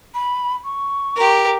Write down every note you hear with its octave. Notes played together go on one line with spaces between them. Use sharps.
B5
C#6
G4 A#4